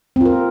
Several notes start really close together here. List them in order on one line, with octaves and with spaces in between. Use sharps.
C4 F4 A#4